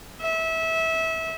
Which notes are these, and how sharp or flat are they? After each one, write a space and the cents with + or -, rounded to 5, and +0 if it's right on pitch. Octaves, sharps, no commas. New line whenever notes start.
E5 -25